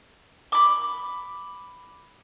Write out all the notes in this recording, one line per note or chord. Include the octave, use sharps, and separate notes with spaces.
B5 D6